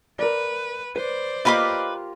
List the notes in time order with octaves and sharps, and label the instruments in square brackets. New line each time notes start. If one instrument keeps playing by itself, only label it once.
[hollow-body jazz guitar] A#4 D5 [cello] B4
[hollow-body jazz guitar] B4 [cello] C5 D5
[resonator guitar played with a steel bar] A#3 F4 G4 [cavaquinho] B4 B5 D6 [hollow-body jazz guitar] D#5